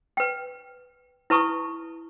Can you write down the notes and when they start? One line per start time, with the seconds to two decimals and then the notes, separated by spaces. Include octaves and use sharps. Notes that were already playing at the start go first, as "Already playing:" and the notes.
0.17 B4 G5
1.30 E4 B4 A5 C#6 D#6